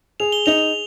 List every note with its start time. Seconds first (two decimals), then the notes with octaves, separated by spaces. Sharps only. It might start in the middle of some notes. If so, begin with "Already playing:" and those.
0.20 G#4 F7
0.32 G7
0.46 D#4 F7